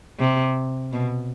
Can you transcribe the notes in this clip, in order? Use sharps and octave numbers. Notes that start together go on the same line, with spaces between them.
C3
B2